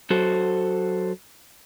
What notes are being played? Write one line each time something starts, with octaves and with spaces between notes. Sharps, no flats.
F#3 F#4 A4 C5